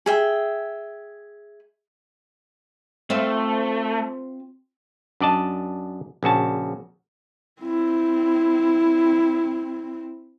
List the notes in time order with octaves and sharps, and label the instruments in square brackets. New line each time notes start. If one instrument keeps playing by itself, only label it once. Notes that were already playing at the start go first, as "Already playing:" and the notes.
[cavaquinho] G#4 E5 G5
[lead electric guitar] A3 [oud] C4 F4 E5
[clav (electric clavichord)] F#2 D4 D5 D#5 A5
A#1 C#3 F#4 A5
[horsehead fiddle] C4 E4